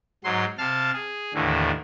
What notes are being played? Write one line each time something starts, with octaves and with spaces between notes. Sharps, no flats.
G#2 F#3 C6
C3 F5 A5 F6
G#4
D#2 A2 D3 E3